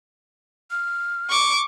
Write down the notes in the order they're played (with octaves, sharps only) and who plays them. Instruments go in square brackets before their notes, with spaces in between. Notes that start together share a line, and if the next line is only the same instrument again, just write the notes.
[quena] F6
[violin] C#6 D6